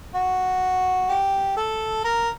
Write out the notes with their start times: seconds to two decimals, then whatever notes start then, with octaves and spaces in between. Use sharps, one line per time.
0.15 F#4
1.09 G4
1.56 A4
2.04 A#4